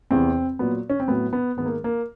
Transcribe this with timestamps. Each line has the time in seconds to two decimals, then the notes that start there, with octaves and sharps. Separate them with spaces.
0.11 E2 C3 E3 C4
0.59 A#2 F#3 B3
0.90 C#4
1.00 C4
1.08 A2 F#3 B3
1.33 B3
1.57 G#2 D#3 G#3 B3
1.66 A#3
1.84 A#3